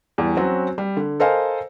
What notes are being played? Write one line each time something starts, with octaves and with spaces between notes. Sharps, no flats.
E2 G3
F#3 C4 C#4 F#4
G3
D3
A4 A#4 C5 D#5 F5 G#5